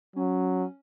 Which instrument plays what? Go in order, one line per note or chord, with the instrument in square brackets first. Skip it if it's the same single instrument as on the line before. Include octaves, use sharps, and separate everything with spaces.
[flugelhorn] F#3 [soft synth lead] C#4